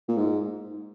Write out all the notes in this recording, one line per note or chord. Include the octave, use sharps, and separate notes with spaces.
A#2
G#2